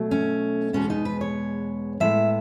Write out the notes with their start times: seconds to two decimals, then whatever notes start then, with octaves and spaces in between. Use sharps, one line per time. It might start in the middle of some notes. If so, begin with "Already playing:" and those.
Already playing: B2 F#3 A3
0.11 C#4
0.73 E2 B2 G#3 B3 C#4
0.90 D#4
1.05 B4
1.21 C#5
2.00 A2 G#3 B3 E5